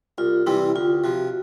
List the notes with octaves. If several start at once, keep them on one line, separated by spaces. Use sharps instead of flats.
C2 F4
C3 E3 G3 C4 E4
D2 F4
C3 F3 F#4